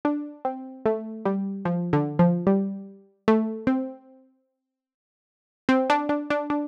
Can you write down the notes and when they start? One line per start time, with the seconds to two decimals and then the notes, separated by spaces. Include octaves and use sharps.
0.05 D4
0.45 C4
0.86 A3
1.25 G3
1.65 F3
1.93 D3
2.19 F3
2.47 G3
3.28 A3
3.67 C4
5.69 C4
5.90 D4
6.09 D4
6.30 D4
6.50 D4